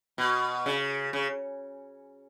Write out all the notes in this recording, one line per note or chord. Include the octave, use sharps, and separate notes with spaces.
B2
C#3
C#3